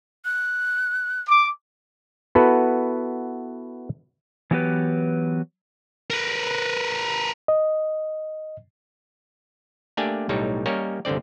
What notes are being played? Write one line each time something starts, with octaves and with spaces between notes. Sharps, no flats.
F#6
D6
B3 E4 F#4 A4 B4
E3 F#3 B3 G4 B4
A#4 B4
D#5
A3 A#3 D4 G4 D5 G#5
B1 A2 G3 D#4 C#5
G3 A#3 C#4 A#4 C#5 D#5
G1 C2 D3 C4 D5